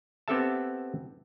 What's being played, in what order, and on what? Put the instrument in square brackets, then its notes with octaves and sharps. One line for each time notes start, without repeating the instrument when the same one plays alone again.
[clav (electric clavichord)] B3 C4 G4 A4 E5 A5